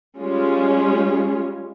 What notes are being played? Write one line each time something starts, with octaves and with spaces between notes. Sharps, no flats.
G3 G#3 C#4 F4